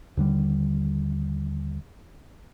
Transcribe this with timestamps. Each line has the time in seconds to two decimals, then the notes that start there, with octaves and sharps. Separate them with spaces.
0.17 D#2 D3 G3